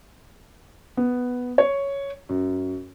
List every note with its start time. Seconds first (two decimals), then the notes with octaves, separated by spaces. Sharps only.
0.97 B3
1.58 C#5
2.29 F#2